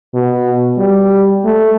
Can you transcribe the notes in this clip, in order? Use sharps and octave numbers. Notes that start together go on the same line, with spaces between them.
B2
G3
A3